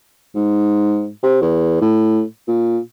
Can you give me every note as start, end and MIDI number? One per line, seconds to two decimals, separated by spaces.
0.35 1.09 44
1.23 1.39 48
1.42 1.80 40
1.81 2.22 45
2.48 2.78 46